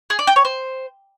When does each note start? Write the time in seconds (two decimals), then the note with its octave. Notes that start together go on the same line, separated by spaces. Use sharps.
0.10 G#4
0.19 D5
0.27 G5
0.36 C#5
0.45 C5